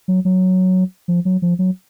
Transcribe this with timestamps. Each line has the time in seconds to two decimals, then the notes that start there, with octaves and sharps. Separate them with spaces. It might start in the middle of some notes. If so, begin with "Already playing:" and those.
0.08 F#3
0.25 F#3
1.08 F3
1.25 F#3
1.42 F3
1.59 F#3